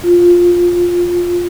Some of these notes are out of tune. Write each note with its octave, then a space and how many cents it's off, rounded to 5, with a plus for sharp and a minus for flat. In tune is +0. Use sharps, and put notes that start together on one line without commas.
F4 +10